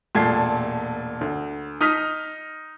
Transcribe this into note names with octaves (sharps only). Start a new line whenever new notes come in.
E1 A#2 A3 A5 G#6 C7
D2
D#4 D#6 F6 B6